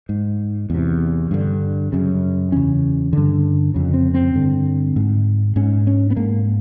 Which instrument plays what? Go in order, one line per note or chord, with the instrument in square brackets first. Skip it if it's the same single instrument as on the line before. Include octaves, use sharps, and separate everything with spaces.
[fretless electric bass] G#2
E2 C3
G2 D3
F#2 C#3
E2 C#3 C#4
G2 D3
F2 C#3
C4
C4
G2 D3
G#2
G#2 C#4
C#4
B3
G#2 A#3